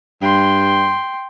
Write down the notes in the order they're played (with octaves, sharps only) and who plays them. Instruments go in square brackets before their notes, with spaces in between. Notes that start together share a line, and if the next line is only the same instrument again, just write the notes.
[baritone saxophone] G2 [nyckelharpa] G5 C6